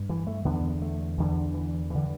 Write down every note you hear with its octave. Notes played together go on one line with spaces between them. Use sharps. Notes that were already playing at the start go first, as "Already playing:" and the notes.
Already playing: G2
E3
A3
E2 D3 B3
A3
E2 D3 E3
E3
G2 D3 E3